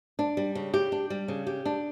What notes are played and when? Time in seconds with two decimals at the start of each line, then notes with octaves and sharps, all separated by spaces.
0.19 D4
0.37 G3
0.55 C#3
0.74 G4
0.92 D4
1.10 G3
1.28 C#3
1.47 G4
1.65 D4